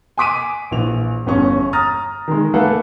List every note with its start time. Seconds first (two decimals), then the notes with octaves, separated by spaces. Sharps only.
0.18 G#5 C6 D6 B6 D7 D#7
0.71 A#1 E3 F7
1.26 G1 E2 C#4 C#6
1.73 A#5 D#6 F6 A6 A#6
2.28 D#3 G#3
2.54 A3 A#3 A4 B4 F5 F#5